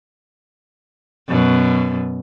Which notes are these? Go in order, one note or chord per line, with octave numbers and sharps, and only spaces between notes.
F#2 B2